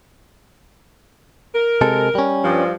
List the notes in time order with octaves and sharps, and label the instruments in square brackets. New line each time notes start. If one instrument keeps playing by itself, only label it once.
[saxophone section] A#4
[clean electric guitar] C3 G#3 A4
G3 C#4
[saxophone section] G2 F3